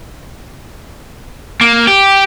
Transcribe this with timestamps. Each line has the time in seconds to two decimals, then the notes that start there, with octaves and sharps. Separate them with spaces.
1.61 A#3
1.87 G4